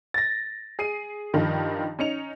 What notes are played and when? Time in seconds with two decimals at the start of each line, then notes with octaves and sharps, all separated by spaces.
0.14 A6 A#6
0.79 G#4 C7 D#7
1.34 G2 D#3 F3
1.99 C#4 D#4 C#7 F7